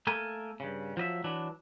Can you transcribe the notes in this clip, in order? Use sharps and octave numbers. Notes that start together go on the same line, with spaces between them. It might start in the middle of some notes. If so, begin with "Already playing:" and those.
A3 A#3 A4 A#4 G#5
G2 C#3
F3 F#3 D#5 E5
E3 F#3 D4